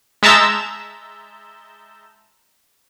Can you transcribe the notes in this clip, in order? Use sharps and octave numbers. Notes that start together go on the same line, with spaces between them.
G#3 E5 A5 A#5 E6 G6